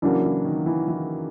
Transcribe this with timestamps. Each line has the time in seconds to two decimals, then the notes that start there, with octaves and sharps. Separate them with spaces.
0.02 C#3 E3 F#3 A#3 D4
0.24 E3
0.45 D#3
0.66 E3
0.88 E3